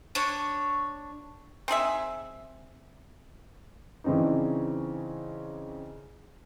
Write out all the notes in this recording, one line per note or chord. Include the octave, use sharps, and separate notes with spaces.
D4 C#5
C4 D#4 G#4 E5
C#3 E3 C4 D4 D#4